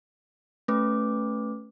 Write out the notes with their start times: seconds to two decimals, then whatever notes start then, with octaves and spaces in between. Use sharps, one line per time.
0.68 A3 C#4 B4 D6